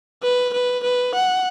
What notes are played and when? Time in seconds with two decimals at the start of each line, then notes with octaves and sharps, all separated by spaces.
0.23 B4
0.54 B4
0.83 B4
1.15 F#5